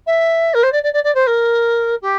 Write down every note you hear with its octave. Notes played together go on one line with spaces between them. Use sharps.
E5
A#4
C5
D5
D5
D5
D5
C5
A#4
G4